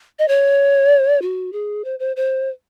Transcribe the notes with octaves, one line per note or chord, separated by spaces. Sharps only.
D#5
C#5
F#4
G#4
C5
C5
C5